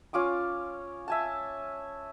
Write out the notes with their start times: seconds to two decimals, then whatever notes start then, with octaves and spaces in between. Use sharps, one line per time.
0.13 C#4 F4 D6 D#6
1.08 E5 G#5 A5